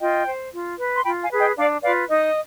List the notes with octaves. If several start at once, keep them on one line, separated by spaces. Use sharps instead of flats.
F4 D#5 G5
C5
F4
B4
C6
F4 G5 B5
F5 G#5
G#4 B4
D#5 G5
D4 D5 F5
F4 B4 D5 F5
D#4 D#5